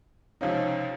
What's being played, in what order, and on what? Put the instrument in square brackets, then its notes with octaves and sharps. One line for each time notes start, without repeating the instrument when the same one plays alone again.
[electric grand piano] C#2 C3 F3 C4 D#4 [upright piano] C#4 F4